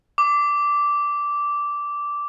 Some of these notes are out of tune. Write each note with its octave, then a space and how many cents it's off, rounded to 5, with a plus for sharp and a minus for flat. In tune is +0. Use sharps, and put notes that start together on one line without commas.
D6 -10